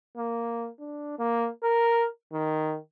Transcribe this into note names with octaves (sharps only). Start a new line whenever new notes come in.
A#3
D4
A#3
A#4
D#3